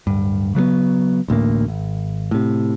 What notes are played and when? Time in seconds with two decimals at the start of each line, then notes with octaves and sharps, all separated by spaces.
0.07 D1 G2
0.55 C#3 F#3 G3 B3
1.28 A1 D2 A2 A#3
1.68 G#1
2.31 A2 C3